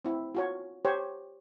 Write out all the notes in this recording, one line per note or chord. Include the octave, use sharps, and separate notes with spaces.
C4 E4
F4 F#4 C#5
G4 C5 C#5